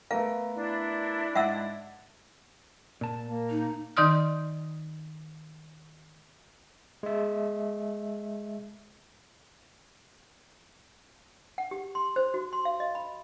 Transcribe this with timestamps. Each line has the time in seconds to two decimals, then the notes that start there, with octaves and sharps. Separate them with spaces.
0.11 A3 B3 A#4 F5
0.55 D4 E4
1.35 G#2 E5 F#5 E6
3.01 A#2 A5
3.27 A#3
3.50 D#4
3.97 D#3 D#4 D5 C6 D#6 F6
7.03 G#3 E5
11.58 F#5
11.71 G4
11.95 C6
12.16 C5
12.34 F#4
12.53 C6
12.65 F5
12.80 D#5
12.95 B5